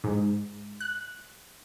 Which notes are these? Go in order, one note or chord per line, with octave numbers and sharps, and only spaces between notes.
G#2
F#6